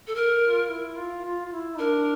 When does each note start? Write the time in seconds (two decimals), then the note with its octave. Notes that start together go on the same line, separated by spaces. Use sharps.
0.07 A4
0.15 A#4
0.43 F4
0.69 E4
0.97 F4
1.24 F4
1.46 F4
1.52 E4
1.79 D4 A#4